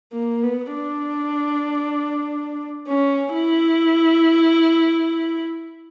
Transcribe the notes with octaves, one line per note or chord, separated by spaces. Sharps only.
A#3
B3
D4
C#4
E4